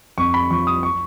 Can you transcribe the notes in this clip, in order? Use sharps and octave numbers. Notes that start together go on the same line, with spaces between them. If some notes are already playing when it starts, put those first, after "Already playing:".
F2 C#6
B5
F3 C#6
D#6
C#6